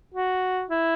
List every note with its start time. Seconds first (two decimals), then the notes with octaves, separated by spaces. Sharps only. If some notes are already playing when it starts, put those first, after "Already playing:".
0.14 F#4
0.70 E4